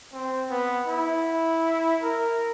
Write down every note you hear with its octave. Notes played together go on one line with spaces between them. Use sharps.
C4
B3
E4
A#4